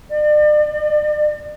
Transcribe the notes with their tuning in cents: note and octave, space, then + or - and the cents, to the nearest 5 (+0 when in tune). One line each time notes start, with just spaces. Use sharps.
D5 +40